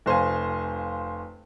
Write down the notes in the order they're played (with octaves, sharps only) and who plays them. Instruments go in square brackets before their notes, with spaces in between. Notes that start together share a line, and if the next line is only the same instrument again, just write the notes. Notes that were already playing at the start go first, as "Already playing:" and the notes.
[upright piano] F1 C5 F5 G#5